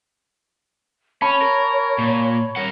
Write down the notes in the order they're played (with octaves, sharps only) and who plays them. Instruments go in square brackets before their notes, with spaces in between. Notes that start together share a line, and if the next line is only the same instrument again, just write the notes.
[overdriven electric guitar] C#4 [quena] C#5 [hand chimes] A5 B5
[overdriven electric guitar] A#4
A#2
A#4 F#5